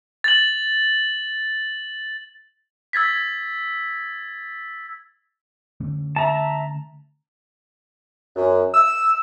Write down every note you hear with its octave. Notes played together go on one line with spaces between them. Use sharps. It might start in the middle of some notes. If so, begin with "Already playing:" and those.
A6 F#7
E6 G#6 A6 B6
D3 A3 C#4
E5 A5 A#5
F#2
E6